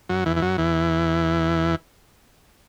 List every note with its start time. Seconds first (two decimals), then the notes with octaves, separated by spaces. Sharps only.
0.09 F#2 F#3
0.26 E2 E3
0.36 E3
0.42 F#2 F#3
0.58 E2 E3